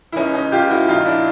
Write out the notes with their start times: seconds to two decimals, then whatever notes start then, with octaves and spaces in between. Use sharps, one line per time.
0.12 E4
0.16 C#2 C#4 D#4
0.34 C#4 D#4
0.52 C#2 F4 G4
0.70 E4 F#4
0.88 A#1 D#4 F4
1.06 D4 E4